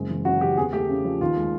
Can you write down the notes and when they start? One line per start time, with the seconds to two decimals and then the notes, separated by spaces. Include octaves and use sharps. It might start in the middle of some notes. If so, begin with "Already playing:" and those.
Already playing: F#1 G#3
0.09 E3
0.25 F#2 F#4
0.41 C#3 G4
0.57 E2 G#4
0.73 A3 G4
0.89 C#3
1.04 F3
1.21 D#2 F4
1.36 G#3